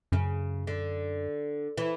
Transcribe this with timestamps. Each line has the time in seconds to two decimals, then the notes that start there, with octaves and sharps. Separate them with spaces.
0.12 F#2 C#3
0.67 D3
1.78 E3